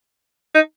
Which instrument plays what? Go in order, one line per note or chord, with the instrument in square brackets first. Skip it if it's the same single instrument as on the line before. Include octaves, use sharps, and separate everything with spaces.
[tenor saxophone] D#4